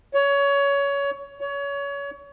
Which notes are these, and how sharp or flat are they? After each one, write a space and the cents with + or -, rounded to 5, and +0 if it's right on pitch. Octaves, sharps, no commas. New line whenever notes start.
C#5 +20
C#5 +25